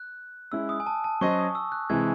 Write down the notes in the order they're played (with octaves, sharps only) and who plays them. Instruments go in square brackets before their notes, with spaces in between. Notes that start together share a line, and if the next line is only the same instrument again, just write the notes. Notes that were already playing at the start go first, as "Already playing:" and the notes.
Already playing: [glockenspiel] F#6
[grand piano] G#3 C#4 E4 [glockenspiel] E6
[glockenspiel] D#6
G#5
A5
A5
[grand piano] F#3 C#4 F#4 C5 D#5 [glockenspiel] C#6
[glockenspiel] D#6
E6
F#6
[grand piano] C3 E3 G#3 [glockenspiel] G#6